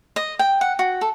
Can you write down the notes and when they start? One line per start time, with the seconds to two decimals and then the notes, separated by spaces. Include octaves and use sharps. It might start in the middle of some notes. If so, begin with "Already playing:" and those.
0.16 D#5
0.39 G5
0.61 F#5
0.79 F#4
1.01 A4